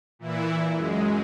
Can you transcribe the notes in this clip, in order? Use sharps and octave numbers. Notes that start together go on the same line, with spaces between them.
A#2 E3 E4
F#2 G#3